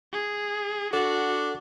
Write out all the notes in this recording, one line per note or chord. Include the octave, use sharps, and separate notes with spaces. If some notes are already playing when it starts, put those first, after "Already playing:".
G#4
D4 F#4 A4 F#5